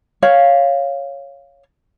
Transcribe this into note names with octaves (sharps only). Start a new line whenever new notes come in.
C#5 F5